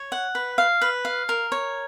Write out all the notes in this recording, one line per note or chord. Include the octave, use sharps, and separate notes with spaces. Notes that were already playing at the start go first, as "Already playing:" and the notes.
Already playing: C#5
F#5
B4
F5
B4
F5
A#4
C#5